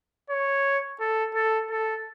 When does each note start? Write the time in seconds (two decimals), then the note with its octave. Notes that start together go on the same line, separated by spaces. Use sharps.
0.30 C#5
1.00 A4
1.34 A4
1.71 A4